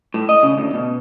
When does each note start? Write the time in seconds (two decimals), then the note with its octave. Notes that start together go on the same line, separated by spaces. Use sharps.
0.14 A2
0.29 D#5
0.43 C#3
0.57 D2
0.74 B2